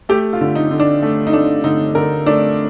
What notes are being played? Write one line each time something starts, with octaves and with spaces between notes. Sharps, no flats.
A3 G4
F4
D3
D#4
D3
D4
A3
D#4
A3 D4
D3 D#4
D3 A#4
A3 D4